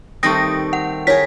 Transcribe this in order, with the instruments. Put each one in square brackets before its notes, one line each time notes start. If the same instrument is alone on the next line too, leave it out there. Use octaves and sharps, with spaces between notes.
[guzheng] D#3 G3 C4 [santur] A3 G5 [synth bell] D#6 A#6
[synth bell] F#5
[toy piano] E4 C#5 [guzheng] G#4 A#4 [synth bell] B6